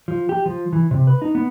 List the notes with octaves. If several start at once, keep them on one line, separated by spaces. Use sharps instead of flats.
F3
G4
F3
E3
C3
B4
D#4
B3